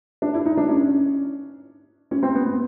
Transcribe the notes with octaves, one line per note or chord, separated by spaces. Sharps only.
D4
E4
D#4
D4
C#4
C#4
C4
B3
B3